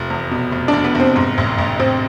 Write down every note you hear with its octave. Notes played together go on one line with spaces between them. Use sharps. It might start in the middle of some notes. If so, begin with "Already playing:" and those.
Already playing: F1 F3
E2
B2
F1
D4
F1
B3
F1 C4
G#2
A1
A1
A1 C4